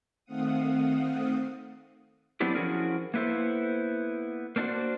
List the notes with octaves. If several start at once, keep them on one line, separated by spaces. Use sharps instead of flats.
D#3 A3 C4 F5 F#5 D#6
F#3 B3 C4 D4 E4 G4
F3 C#4 E4 F#4 G#4 A#4
A#3 B3 E4 A4 C5
A#3 C4 D4 F4 F#4 C5